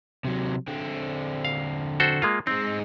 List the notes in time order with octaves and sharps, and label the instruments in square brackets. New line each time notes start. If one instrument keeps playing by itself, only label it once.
[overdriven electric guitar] C3 F#3
D3 C4
[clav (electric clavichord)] F5
F#4 A4 C5
G#3 A#3 F4
[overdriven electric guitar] G#3 D#4 [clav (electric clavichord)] C4